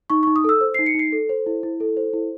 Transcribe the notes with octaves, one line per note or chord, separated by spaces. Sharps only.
D#4 C#6
D#4 C#6
D#6
A4 E6
C5
D#4 C7
C#7
D#4 C7
A4
C5
E4
E4
A4
C5
E4